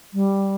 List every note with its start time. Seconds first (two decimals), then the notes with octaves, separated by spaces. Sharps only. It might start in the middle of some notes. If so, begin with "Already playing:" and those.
0.14 G3